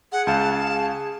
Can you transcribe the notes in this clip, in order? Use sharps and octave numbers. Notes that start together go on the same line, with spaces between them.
G#4 F#5
C#2 F5 A5